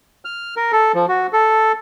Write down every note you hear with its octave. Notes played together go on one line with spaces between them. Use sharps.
F6
A#4
A4
F3
F#4
A4